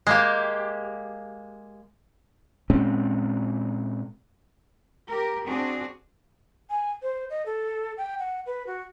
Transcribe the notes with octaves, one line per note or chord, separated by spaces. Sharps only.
G#3 A#3 G4
A#2 G#3 C4 C#4
G4 A#4
C4 D4 F#4 G#4
G#5
C5
D#5
A4
G5
F#5
B4
F#4